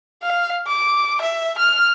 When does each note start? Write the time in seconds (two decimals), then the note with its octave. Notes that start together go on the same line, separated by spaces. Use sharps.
0.23 F5
0.67 D6
1.21 E5
1.58 F6